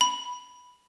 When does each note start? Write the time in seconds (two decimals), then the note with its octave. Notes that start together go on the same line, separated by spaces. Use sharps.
0.01 B5